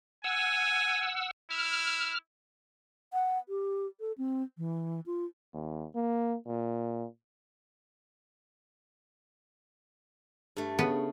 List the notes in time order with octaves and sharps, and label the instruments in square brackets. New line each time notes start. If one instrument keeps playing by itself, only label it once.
[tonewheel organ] F#5 E6 [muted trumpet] G#5
[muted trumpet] E4 [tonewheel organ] F6
[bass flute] F#5
G4
A4
C4
E3
F4
[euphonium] D#2
A#3
A#2
[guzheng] G2 A3
[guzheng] C#3 [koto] B3